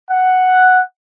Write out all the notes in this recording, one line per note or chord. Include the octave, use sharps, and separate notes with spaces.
F#5